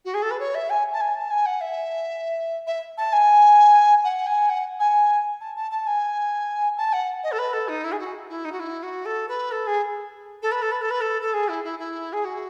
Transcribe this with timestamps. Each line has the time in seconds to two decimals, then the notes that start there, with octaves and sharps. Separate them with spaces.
0.05 F#4
0.14 G#4
0.22 A4
0.30 B4
0.39 C#5
0.54 E5
0.69 G#5
0.92 A5
1.00 G#5
1.15 A5
1.30 G#5
1.45 F#5
1.60 E5
2.67 E5
2.97 A5
3.12 G#5
4.04 F#5
4.26 G#5
4.49 F#5
4.79 G#5
5.40 A5
5.56 A5
5.71 A5
5.86 G#5
6.77 A5
6.92 F#5
7.23 D#5
7.31 A4
7.38 B4
7.53 A4
7.68 D#4
7.84 E4
7.92 G#4
7.99 F#4
8.29 E4
8.44 D#4
8.52 F#4
8.59 E4
8.82 F#4
9.05 A4
9.28 B4
9.51 A4
9.66 G#4
10.42 A4
10.51 B4
10.62 A4
10.71 B4
10.81 A4
10.90 B4
11.00 A4
11.21 A4
11.33 G#4
11.48 E4
11.64 E4
11.78 E4
12.12 G#4
12.24 F#4